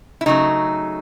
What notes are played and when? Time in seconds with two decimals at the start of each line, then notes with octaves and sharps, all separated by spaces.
0.21 E4
0.26 C#3 F#3 A3 D#4